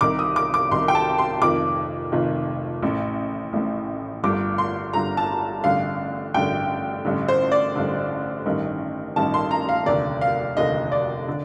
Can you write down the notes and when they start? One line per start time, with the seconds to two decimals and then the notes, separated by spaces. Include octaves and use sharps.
0.01 C2 C3 D#3 D6
0.19 D#6
0.36 D6
0.54 D6
0.71 C2 C3 D#3 C6
0.88 G5
0.95 A5
1.18 C6
1.41 F1 F2 D#3 D6
2.12 F1 F2 D#3
2.82 A1 A2
3.53 A1 A2
4.23 G1 G2 D3 D6
4.58 C6
4.93 G1 G2 D3 A#5
5.17 A5
5.64 A1 G2 D3 F5
6.34 A1 G2 D3 G5
7.05 A1 G2 D3
7.28 C5
7.52 D5
7.75 A1 G2 D3
8.45 A1 G2 D#3
9.16 A1 G2 D#3 A5
9.34 C6
9.51 A#5
9.69 F5
9.86 F1 D#2 D3 D5
10.21 F5
10.57 F1 D#2 D3 D#5
10.92 D5
11.28 D3